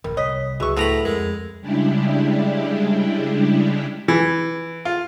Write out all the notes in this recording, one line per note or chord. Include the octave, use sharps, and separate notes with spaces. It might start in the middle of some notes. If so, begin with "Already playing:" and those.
D1 A1 A#2 G3 A#4
C2 C#5 D#5 B6
C#2 E3 F#3 F#4 G#4 C#6 E6
A2 F3 B3 E4 A#5 B5
F2 G#3 A#4
C#3 G3 G#3 D4 E4 G4
E3
F4